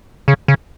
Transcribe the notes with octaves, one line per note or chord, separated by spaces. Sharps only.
C#3
C#3